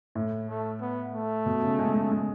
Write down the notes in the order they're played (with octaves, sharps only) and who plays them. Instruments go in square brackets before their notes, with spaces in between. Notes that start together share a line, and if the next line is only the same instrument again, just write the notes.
[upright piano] A2
[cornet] A3
B3
A3
[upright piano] B2
C#3
G#3
G#3
G#3